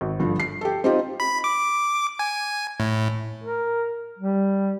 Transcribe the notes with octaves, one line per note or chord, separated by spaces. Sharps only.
G#1
G2 D3 F3
C7
G4 A4
C4 D#4 F4 G4 D#5
B5
D6
G#5
A2
A#4
G3